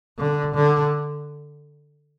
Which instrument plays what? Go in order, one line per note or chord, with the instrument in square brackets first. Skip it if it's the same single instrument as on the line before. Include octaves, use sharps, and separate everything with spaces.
[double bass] D3
D3